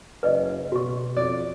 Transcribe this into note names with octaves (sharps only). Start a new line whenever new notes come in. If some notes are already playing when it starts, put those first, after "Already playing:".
F#1 B4 D5 D#5
B2 F#4 C#6
F2 D5